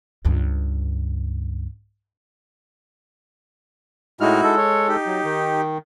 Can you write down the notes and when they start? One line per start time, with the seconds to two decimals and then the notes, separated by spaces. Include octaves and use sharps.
0.25 C#2 G2
4.21 A2 G#3 D#4 E4 F#4 F6
4.43 G#3 A4
4.57 C#5
4.88 D#4 G4
5.06 F#3
5.24 D#3